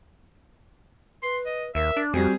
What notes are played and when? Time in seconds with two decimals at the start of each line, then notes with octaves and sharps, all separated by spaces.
1.23 B4 C6
1.46 D#5
1.75 D#2 A#4 E5
1.97 D4
2.14 F2 G3 C4 F#4 G#4